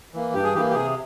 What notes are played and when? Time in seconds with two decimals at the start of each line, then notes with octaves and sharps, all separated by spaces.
0.14 E3 A#3
0.34 G2 G4
0.44 G#4
0.55 E3 G4
0.58 A#3
0.71 G4
0.74 C3 G#4